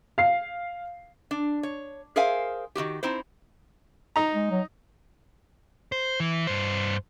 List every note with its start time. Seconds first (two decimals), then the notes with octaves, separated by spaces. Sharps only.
0.18 F5 C7
1.31 D4
1.63 C#5
2.16 G#4 A#4 C5 E5 F5 G#5
2.75 D#3 C4 F#4 G4
3.03 C4 D#4 E4 C5
4.16 D#4 A#5
4.35 G#3
4.50 F#3
5.92 C5
6.20 E3
6.47 G2 C5